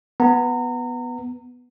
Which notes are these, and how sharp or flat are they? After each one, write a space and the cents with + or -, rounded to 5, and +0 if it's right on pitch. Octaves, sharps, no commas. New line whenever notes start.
B3 +0 A#5 -30